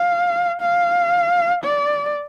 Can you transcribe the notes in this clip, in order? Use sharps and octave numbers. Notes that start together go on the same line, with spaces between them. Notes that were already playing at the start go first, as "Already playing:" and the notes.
Already playing: F5
F5
D5